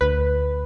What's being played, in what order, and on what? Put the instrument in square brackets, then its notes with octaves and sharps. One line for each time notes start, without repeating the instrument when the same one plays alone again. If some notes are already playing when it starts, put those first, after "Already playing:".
[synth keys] D2 B4